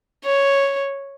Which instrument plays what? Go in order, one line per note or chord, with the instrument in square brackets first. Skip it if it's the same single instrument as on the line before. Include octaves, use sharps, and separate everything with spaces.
[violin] C#5